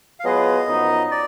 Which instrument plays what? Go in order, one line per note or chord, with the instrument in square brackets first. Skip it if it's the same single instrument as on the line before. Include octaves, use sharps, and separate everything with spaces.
[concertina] F5
[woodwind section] F#3 B3 F4 G#4 B4 [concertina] D#5
[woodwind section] F#2 F3 B3 D#4
[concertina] D5